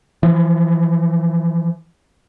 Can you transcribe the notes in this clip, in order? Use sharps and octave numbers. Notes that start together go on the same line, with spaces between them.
E3 F3